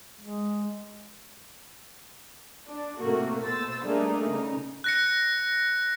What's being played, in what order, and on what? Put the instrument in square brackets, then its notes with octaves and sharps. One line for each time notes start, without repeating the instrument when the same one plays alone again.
[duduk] G#3
[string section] D4
A2 C3 A3 A#3 F#4
B2 C5 E6 A6
G3 A3 A#3 D4 D#4 G#4
C#3 D#4
[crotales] F#6 A#6 C#7